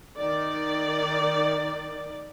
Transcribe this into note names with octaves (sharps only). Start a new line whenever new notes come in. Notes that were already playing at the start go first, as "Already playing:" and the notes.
D#3 D5